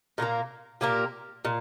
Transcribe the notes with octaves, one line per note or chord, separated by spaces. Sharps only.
A#2 A#3 G4 A#4
A#2 A#3 G4 A#4
A#2